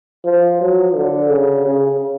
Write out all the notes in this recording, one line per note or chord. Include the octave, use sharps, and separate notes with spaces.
F3
F#3
D3
C#3
C#3